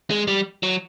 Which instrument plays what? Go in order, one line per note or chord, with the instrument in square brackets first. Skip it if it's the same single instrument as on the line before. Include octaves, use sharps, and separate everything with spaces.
[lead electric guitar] G#3
G3
F#3